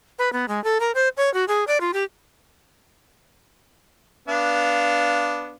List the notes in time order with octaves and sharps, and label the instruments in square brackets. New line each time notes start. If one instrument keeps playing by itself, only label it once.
[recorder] B4
B3
G#3
A4
A#4
C5
C#5
F#4
G#4
D5
F4
G4
[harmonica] B3 D4 F5